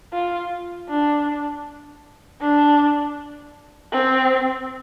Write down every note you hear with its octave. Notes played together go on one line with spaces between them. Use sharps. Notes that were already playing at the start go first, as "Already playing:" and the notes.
F4
D4
D4
C4